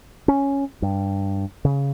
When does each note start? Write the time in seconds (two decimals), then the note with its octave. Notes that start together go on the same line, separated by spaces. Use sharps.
0.28 C#4
0.82 G2
1.65 C#3